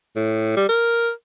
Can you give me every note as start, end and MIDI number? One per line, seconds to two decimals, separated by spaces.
0.16 0.54 45
0.57 0.65 55
0.69 1.11 70